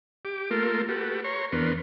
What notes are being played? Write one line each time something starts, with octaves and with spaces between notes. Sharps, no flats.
G4 D6
A3 A#3 F4 A4 A#4 C6
F#4 G4 A4 B4
C#5 A#5 C6 C#6
E2 B3 D4 A#4 B4 C6